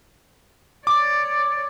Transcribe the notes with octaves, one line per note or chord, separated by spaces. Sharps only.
C#5 D5 D6